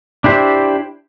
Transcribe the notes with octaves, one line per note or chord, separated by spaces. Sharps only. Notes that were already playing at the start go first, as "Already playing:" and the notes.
D4 E4 G4 C5